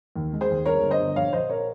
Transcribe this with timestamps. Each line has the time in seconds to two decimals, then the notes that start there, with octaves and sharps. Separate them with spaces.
0.16 D#2
0.33 G#3
0.41 G#4 C5
0.49 D#2
0.65 G1 A#4 C#5
0.82 G1
0.91 C5 D#5
1.00 G1
1.16 A#1 C#5 F5
1.33 A#1 C5 D#5
1.49 A#4 C#5